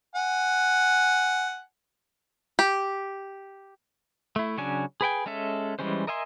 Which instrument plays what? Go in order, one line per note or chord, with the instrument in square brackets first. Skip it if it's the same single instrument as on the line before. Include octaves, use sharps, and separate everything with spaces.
[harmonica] F#5 G#5
[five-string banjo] G4
[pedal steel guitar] A3 E4
C#3 F#3 C#4 D4 G#5
G#4 B4 G5 G#5
G#3 C#4 A4 E5
E3 G3 G#3 C#4 C5
A#4 D#5 E5 G#5 C6